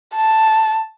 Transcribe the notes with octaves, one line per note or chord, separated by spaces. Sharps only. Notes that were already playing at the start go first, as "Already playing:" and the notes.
A5